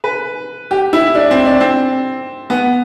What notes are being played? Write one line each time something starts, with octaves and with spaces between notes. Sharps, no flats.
B4
G4
E4
D4
C4
D4
C4
B3